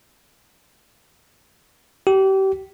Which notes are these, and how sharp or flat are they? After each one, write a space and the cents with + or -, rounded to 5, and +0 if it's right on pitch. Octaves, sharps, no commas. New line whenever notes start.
G4 -30